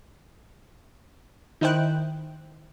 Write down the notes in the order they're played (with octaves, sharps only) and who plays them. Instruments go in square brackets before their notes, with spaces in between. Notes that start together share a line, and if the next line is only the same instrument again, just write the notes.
[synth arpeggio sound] D#3 D#4 E4 C5 G5 F#6